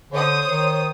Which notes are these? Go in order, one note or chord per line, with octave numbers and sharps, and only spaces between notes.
D3 C5 C#5 D#6
D#3